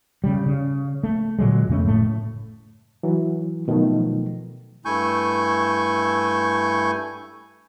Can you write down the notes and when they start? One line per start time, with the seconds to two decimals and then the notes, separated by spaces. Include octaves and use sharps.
0.24 C#3 G3
0.46 C#3
1.03 A3
1.39 A#2 D3 F#3 G#3
1.69 F2 C#3 A3 C#4
1.86 F#1 A2 A3
3.03 E3 F#3
3.68 B2 D#3 F3 F#3 A3
4.85 G2 A3 E4 G#5 C#6 G6